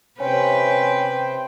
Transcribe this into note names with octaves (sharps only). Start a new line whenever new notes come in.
C3 C#4 B4 C5 G5